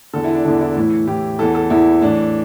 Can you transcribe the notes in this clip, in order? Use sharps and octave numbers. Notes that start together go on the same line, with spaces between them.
E2 D3 A4
E4
D4
E2 D3 D4
E4
A2 E3
A2 E3 G4
E2 E3 A4
A4
E2 E3 E4
A2 E3 D4